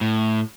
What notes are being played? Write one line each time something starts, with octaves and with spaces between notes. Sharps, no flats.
A2